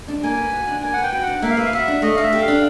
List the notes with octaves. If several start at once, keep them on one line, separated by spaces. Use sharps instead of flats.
D4
A#3 G#5
B4
F#4
D4
A#3 G#5
F#5
B4 G5
F#4 G5
D4 F#5
A#3 E5
F5
B4 E5
F5
F#4 E5
D4
A3 D#5
A3 F5
E5
G4
F5
D4